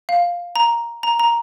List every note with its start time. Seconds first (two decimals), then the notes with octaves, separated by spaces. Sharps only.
0.09 F5
0.56 A#5
1.03 A#5
1.19 A#5